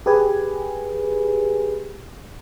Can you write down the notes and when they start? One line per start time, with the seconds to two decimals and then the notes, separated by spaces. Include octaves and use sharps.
0.06 G4 G#4 B4 G#5